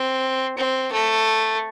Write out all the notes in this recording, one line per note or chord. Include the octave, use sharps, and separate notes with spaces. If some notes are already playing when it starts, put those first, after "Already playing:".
Already playing: C4
C4
A3